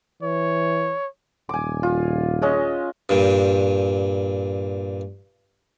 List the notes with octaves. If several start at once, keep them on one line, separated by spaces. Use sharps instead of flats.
E3 C#5
D#1 G#5 D6
F4
G#3 C#4 D#5
G2 A#2